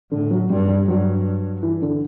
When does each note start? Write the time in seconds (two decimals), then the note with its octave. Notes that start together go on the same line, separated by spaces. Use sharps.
0.11 A2 D3
0.31 F#3
0.50 G2 G3
0.68 G3
0.88 G2 F#3
1.63 E3
1.82 D3